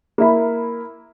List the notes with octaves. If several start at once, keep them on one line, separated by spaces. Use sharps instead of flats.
A#3 E4 B5